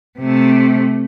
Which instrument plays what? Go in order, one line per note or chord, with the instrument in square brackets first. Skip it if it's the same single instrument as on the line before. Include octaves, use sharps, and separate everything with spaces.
[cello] C3 A3